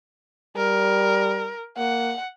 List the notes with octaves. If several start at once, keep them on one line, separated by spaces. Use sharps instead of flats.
G3 A#4
A#3 F#5